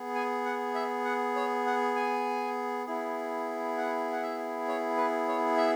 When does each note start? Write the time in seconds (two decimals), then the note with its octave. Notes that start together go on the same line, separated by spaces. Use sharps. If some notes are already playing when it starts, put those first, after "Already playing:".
Already playing: B3 G#4
0.15 G#5
0.45 F#5
0.75 E5
1.05 F#5
1.36 C#5
1.66 F#5
1.96 G#5
2.87 B3 E4 G#4
3.78 F#5
4.12 F#5
4.23 E5
4.68 C#5
4.97 B4
5.28 C#5
5.57 E5